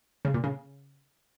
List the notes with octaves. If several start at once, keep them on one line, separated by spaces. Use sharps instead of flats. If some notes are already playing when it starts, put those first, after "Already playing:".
C#3
A#2
C#3